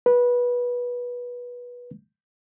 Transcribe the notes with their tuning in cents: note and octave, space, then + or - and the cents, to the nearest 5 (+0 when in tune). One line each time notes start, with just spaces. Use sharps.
B4 -20